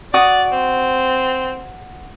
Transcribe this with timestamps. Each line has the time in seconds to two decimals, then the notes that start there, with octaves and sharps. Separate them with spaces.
0.14 F#4 D5 D#6
0.52 C4